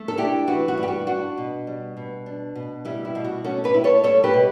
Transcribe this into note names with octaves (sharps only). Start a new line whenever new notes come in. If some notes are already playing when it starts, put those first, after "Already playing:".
Already playing: A3
A4
D4 E4 G4
E3 F#4
F#4
G2
G4
F#4
D4 F#4
B2
G3
B2
D4
B2
G3 E4 G4
E4
B2
F#4
C#4 F#4 A4
G4 B4
E4
A4 C#5
G3 A4 C#5
G4 B4
B2